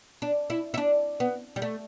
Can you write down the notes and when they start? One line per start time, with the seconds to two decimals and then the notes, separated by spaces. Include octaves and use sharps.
0.22 D4
0.50 E4
0.74 E4
0.78 D4
1.20 B3
1.56 G3
1.62 A3